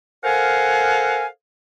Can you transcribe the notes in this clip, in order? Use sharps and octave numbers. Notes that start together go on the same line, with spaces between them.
A4 A#4 C5 F5 F#5 G#5